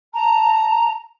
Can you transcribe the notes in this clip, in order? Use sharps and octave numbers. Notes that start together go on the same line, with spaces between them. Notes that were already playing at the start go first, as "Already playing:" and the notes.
A5 A#5